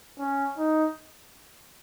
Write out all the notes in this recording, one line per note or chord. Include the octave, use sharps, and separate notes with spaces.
C#4
D#4